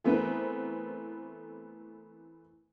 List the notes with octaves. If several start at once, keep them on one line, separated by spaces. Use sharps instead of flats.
E3 A3 B3 C4 A#4 B4